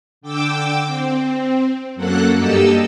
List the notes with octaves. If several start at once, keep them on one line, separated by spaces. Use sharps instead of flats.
D3 G5 D6 E6
C4
F#2 F#3 A#3 A4 F#5 F#6
G2 A#3 G4 A4 D#5 E6